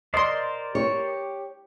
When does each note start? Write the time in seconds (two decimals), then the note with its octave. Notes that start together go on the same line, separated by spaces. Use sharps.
0.14 A#4 C5 D5 D#5 C6
0.75 G4 C#5